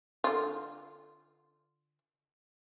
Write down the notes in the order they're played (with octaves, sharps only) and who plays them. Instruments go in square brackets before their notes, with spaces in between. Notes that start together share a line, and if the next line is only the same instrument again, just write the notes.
[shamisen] D3 F4